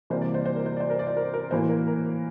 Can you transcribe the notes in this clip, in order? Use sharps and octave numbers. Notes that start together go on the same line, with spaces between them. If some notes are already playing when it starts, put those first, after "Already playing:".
C3 E3 G3 A#3 C5
D5
C5
C5
A#4
C5
D5
C5
A#4
D5
C5
A#4
A#4
A2 E3 A#3 C5
A#4
A#4